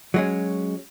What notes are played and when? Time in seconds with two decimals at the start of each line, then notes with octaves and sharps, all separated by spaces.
0.14 F#3 G#3 C#4